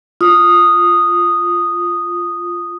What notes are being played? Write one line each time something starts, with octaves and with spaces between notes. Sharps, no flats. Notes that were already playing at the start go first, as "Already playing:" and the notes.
F4 D#6